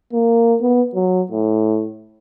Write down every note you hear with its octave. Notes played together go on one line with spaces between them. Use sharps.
A#3
B3
F#3
A2